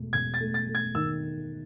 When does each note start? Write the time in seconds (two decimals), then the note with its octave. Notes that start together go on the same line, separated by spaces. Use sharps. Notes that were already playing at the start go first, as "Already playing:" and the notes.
Already playing: E1 A3
0.13 E1 G#6
0.34 A6
0.40 A3
0.54 A6
0.68 A3
0.75 G#6
0.95 D#3 E6